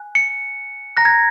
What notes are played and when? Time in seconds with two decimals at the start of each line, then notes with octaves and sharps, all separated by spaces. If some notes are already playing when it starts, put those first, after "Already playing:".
Already playing: G#5 F#6
0.15 C#7
0.97 A#5 F#6 A#6
1.05 G#6